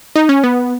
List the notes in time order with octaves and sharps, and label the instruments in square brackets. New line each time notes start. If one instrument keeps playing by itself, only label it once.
[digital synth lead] D#4
C#4
B3